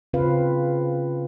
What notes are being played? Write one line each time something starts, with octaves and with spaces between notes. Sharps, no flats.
C#3 C4 F4 B4 F5